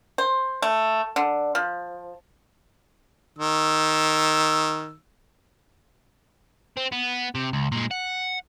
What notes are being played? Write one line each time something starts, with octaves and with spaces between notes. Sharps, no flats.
C5
A3
D3
F3
D#3 E6
C4
B3
C3
C#2
A#2 G#3
F#5